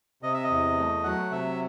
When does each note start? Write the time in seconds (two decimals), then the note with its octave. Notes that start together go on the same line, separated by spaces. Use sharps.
0.22 C3 D#5
0.34 E5
0.43 D#5
0.50 E2
0.78 A3
1.04 F#3 F#5
1.31 C3 E5